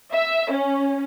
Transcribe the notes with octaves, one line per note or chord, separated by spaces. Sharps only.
E5
C#4